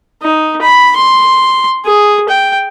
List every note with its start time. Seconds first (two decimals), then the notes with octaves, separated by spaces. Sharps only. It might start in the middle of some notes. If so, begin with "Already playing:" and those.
0.22 D#4
0.61 B5
0.96 C6
1.85 G#4
2.29 G5